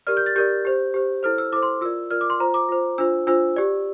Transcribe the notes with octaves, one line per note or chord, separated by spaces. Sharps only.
G4 A#4 D5 F6
G6
A6
G4 A#4 D5 G6
G4 C5
G4 C5
E4 A4 C5 F6
E6
E4 A4 C5 D6
C6
F4 A#4 D5 E6
F4 A#4 D5 F6
D6
C6
F4 C5 A#5
D6
F4 C5
D4 F4 C5 E6
D4 F4 C5 E6
G4 D5